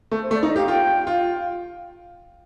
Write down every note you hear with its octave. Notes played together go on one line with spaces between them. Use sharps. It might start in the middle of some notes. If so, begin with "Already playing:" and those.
A3
C5
A3
D5
D#4
D#5
G4 F5
F4 G5
F4